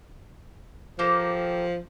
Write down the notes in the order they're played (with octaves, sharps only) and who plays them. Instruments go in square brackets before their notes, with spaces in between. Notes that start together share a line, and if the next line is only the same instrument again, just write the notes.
[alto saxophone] F3 [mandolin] A#3 G4 A4